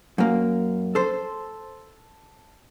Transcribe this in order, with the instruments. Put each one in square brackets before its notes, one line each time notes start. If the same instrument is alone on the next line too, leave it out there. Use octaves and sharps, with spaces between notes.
[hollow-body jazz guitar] F#2 A#3
A4 C5